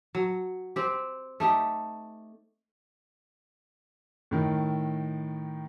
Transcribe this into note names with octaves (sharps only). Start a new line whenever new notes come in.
F#3
C4 G4
A3 D#4 G4
A2 D#3